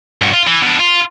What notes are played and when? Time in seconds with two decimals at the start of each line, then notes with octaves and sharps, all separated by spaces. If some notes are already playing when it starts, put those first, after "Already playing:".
0.22 G2 F#4
0.33 F4
0.47 E3
0.62 B2 D4
0.79 F4